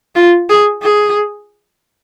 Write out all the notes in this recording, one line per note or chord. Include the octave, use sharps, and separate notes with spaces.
F4
G#4
G#4